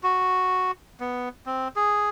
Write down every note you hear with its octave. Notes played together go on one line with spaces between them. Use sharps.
F#4
B3
C4
G#4